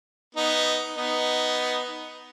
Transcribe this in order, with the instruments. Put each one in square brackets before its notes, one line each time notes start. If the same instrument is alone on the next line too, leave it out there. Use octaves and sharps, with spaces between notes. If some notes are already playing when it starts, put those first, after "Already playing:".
[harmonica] B3 D#4
B3 D#4